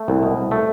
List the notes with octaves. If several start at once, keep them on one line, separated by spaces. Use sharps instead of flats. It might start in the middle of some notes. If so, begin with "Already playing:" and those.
Already playing: A3
C2
B2
C2
A3